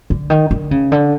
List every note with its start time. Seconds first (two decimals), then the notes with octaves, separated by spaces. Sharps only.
0.10 D3
0.30 D#3
0.51 D3
0.71 C#3
0.92 D3